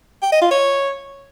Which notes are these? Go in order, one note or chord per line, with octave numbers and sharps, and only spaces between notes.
G5
D#5
F4
C#5